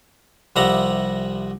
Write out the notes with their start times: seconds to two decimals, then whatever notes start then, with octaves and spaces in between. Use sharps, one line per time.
0.56 C2 F3 G3 E5 F#5 A#5